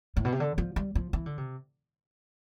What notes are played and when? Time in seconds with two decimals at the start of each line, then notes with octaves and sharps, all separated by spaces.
0.17 A2
0.25 B2
0.32 C3
0.40 D3
0.58 F3
0.76 G3
0.95 F3
1.13 E3
1.26 D3
1.38 C3